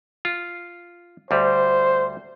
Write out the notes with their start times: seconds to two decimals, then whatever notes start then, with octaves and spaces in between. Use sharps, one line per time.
0.25 F4
1.31 D2 G3 C5